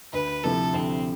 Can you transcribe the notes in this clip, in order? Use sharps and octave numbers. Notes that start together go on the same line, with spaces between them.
D2 B4
C3 F3 A3 E4 A4
D2 C4